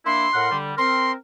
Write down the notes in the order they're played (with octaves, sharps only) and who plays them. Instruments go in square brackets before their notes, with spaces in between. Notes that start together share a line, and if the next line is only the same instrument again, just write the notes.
[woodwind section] A#3 D4 E4 [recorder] C6
[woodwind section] A2 A#4 F#5
D3 G3
[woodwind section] C4 A#4 [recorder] C6